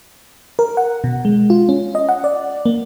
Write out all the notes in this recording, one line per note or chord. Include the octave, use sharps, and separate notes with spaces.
A#4
F#5
B2
G#3
F4
C#4
D#5
F#5
D5
A#3